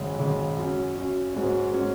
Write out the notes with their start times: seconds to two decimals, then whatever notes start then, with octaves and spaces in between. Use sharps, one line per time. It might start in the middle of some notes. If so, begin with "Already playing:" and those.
Already playing: G#1 F#2 C#3 G#3
0.19 G#1 F#2 C#3 G#3
0.56 F#2 F#3 C#4
0.95 F#2 F#3 C#4
1.33 G#2 G#3 C#4 F#4 C#5
1.72 G#3 C#4 F#4 C#5